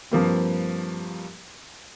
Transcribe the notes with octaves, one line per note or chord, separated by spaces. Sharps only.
G2 F3 A#3 C4